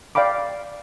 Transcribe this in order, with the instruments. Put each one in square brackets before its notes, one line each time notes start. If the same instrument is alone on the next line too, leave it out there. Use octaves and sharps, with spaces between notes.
[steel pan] D5 F5 G5 B5 D6